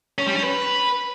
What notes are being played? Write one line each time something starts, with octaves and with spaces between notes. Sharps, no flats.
C#4
G3
C#4
B4